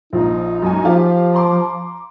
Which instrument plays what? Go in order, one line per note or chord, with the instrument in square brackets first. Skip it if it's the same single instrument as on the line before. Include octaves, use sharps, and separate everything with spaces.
[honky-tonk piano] A#1 F3 [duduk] D#4
[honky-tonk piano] F#2 G#5
[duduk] F3 [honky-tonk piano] F4 G4
[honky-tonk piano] A#5 C6 D6